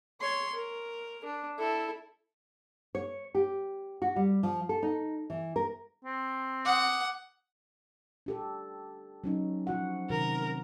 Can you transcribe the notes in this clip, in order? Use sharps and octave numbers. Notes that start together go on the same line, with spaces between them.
C#5 C6
A#4
D4
E4 A4
C#5
G4
F#4
G3
F3
A4
D#4
E3
A#4
C4
F#5 D6 D#6
D4 G4 A4
F#3 C#4 D#4
F3 F#4 F#5
C3 D#3 F#4 A#4